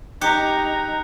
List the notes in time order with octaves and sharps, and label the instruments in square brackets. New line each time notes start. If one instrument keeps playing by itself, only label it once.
[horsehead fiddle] D#4 A#5 [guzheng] G4 [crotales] F#6 C#7